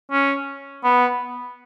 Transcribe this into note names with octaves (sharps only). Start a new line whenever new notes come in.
C#4
B3